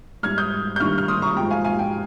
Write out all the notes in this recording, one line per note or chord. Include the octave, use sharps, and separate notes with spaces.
G#2 G3 F6 G#6
D#6 G6
G6
G2 D#3 G3 C#6 F6
F6
C6 D#6
A#5 C#6
G#2 F3 G#3 G5 A#5
F5 G#5
F5 G#5
G5